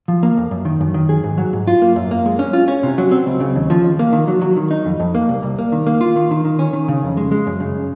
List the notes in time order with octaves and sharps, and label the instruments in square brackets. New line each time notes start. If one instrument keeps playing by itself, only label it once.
[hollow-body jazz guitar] F3
A#3
F2
F#2
D#3
F#2
D#3
G#4
G#2
F#3
G#2
F4
A#3
F#2
A#3
G#3
C#4
F4
C#4
C3
F#3
C4
C#2
C#3
D#2
F3
D#2
A#3
D#3
F#3
F#3
D#3
D#4
F2
F2
A#3
C2
C2
A#3
D#3
A#3
F4
D#3
D#3
D#3
C#4
D#3
C#3
F2
G#3
G#3
F#2
C#3